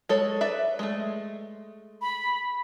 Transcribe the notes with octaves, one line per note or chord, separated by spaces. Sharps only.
G#3 A4 C#5
B4 D5 E5
G#3 A3
B5